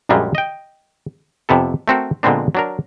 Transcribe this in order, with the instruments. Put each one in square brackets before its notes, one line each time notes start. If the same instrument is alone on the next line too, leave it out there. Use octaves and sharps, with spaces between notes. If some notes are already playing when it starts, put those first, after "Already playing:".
[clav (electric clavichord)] A#1 F#2 A#2 G3 G#3
D#5 G5
F2 C3 B3 A4
A3 C4 F#4 A#4
A#2 D3 G#3 B3 C4 D4
F#3 D4 A#4